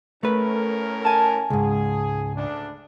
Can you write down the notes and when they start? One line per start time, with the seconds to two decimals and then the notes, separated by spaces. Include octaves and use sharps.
0.23 A2 A3 C#4 A#4 B4
1.03 G#5 A5 F6
1.50 C#2 G#2 G#4
2.35 D2 D4